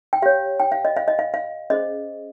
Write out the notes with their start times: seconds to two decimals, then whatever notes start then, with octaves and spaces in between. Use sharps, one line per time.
0.13 G5
0.22 G4 C#5 F5
0.60 G5
0.72 F5
0.85 D#5
0.97 F5
1.08 D#5
1.19 F5
1.34 F5
1.70 C#4 G#4 C5 D#5